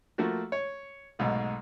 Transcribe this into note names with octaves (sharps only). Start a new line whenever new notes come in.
F3 A3 A#3 F#4
C#5
B1 G#2 B2 A3